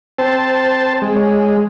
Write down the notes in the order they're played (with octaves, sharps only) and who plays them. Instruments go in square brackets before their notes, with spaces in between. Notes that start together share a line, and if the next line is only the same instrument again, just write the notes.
[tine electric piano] C4 [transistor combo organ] C5 A5
[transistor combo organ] G#3
[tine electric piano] C#5